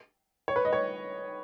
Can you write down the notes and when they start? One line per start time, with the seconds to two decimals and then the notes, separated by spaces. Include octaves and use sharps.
0.48 C#5
0.56 B4
0.65 D#5
0.73 C#5